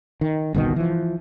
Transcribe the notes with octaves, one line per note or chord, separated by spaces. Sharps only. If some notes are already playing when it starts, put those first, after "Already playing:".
D#3
G1 C2 B2 D#3
E3 F3